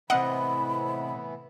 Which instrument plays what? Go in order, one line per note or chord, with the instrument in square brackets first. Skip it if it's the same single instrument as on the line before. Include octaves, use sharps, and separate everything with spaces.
[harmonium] A2 E3 B3 [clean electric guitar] C3 C4 D#5 [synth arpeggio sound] F#5 [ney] B5